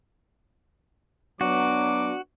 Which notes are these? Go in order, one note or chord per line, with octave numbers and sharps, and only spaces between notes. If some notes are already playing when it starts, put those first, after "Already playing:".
F#3 B3 D4 F#4 D6